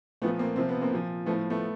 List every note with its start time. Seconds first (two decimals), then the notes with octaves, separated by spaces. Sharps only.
0.22 A#2 F3 A3 B3
0.39 A#3 C4
0.56 C3 F3 C4
0.69 B3
0.81 A#3 C4
0.91 A#2 F3
1.26 A2 F3 A3 B3
1.50 A3 B3